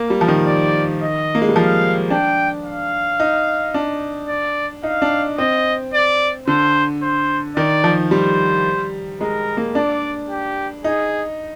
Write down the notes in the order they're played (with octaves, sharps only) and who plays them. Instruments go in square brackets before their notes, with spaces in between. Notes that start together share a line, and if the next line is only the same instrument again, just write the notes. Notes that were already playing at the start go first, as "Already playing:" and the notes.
Already playing: [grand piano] A#3
G3
F3
D#3
[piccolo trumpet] D5
D#5
[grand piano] A#3
G#3
G3
[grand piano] F3 [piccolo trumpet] F5
[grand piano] D4 [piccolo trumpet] G5
[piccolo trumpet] F5
[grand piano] D#4
D4
[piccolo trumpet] D5
[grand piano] D#4 [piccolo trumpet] F5
[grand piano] D4
[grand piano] C4 [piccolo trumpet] D#5
[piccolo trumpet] D5
[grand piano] D3 [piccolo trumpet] C5
[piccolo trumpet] C5
[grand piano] D#3 [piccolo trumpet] D5
[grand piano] F3
[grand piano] G3 [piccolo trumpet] C5
[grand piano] G#3 [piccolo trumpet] A#4
[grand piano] A#3
[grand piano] D4 [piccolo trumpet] D5
[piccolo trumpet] G4
[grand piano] D#4 [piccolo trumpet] G#4